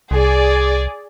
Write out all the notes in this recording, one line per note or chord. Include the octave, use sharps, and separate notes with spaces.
C2 G#4 D5